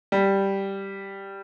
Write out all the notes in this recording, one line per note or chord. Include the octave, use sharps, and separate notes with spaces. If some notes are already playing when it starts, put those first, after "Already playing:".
G3